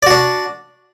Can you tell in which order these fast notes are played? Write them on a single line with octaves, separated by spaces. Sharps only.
D5 F#4 D4